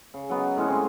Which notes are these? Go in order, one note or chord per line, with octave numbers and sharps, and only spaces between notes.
C#3
F#3 B3 D#4
A2 G#3 C#4 D#4
C4 F4 G#5